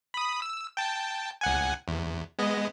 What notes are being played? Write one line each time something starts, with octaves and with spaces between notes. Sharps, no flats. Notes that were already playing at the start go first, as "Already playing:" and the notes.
B5 D#6
E6
G5 A5
C#2 F#5 G#5
E2
G#3 B3 D#5